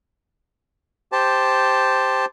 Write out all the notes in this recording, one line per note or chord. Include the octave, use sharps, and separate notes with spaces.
G4 C5 A5